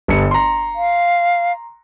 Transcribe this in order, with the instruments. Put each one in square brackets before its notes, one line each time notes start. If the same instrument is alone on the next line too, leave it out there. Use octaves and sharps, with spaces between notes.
[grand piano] G1 G2 C#7
A#5 C6
[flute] F5